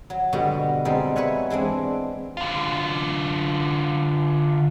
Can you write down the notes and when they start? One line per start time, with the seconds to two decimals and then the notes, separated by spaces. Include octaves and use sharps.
0.10 F#3
0.33 B2 D3 G3 F#4 D#5
0.85 G3 G#3 C4 D#4
1.16 B4 C#5 E5 F#5 G#5
1.50 E3 G#3 C4 D4
2.37 D3 F4